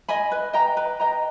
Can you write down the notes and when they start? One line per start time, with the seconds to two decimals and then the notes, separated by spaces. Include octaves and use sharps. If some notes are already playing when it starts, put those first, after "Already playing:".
0.09 D#5 G#5 B5
0.32 B4
0.53 D#5 G5 A#5
0.77 B4
1.00 D#5 G5 A#5